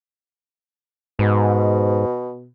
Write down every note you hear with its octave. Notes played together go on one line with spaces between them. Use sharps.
G#2 B2